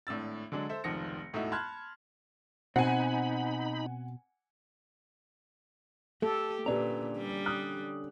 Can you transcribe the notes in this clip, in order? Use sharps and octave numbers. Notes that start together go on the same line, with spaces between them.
G#1 A2 D4 E6 A6
D3 F#3 G#3 D4
A4 C5 E5
F1 C#2 D#3 F3 A#6 C#7
E1 A2 D#4 F#4 A4 E5
A5 B5 C6 F6 F#6 G#6
B2 C4 D#4 F#5 G#5 B5
A3 G4 A4
A#2 D3 C#4 G4 B4 D5 A#5
G3
D#6 F#6